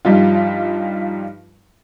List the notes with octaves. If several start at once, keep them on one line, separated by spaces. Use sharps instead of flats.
G2 F3 G3 D#4 F4